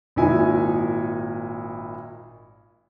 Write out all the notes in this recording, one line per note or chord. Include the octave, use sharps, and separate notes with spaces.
G#1 A#2 D#4 E4 G#5